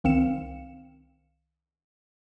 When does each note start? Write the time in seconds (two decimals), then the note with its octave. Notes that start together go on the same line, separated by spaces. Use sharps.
0.04 C2 D#3 C4 F5 C#7 E7